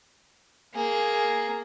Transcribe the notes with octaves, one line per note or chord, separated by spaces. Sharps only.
A#3 G#4